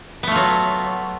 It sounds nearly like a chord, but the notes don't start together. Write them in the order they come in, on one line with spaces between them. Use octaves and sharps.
B3 A3 F4 F#3